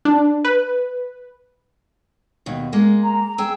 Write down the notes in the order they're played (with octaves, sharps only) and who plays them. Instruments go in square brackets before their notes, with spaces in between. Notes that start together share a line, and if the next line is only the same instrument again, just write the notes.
[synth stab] D4
B4
[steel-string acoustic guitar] D#2 B2
G#3 A#3
[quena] A#5
[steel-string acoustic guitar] G#4 G5 [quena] E6